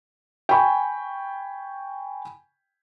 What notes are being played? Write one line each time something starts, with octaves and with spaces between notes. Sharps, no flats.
G5 G#5 B5 C#6